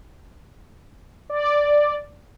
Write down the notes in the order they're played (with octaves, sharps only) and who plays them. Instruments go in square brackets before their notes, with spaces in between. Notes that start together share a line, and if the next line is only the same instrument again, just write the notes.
[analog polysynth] D5